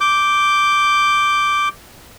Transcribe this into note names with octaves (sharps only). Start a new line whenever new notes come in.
D6 G6